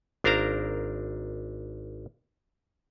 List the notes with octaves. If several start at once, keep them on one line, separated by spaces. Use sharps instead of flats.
G#1 D4 A#4 C5 F5 A#5